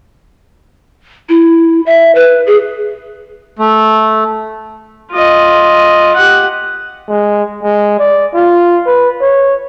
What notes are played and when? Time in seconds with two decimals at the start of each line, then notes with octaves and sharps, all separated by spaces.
1.29 E4
1.86 E5
2.15 B4
2.47 G#4
3.59 A3
5.13 F4 D#5
6.16 G4 F#5
7.09 G#3
7.63 G#3
7.99 D5
8.34 F4
8.86 B4
9.21 C#5